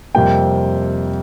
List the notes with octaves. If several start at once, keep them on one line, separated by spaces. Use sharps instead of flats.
F2 C3 G3 A#3 G5